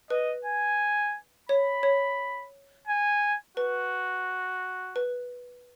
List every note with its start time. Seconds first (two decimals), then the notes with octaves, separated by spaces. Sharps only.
0.10 B4 D#5
0.45 G#5
1.49 C#5 B5
1.83 C#5
2.88 G#5
3.57 F#4 B4
4.96 B4